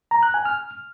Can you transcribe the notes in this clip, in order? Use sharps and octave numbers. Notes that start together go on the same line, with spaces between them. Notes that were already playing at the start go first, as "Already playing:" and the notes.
A#5
F#6
G#5
F6